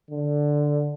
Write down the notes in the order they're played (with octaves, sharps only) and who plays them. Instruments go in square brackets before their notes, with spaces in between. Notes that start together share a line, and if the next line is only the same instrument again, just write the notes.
[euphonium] D3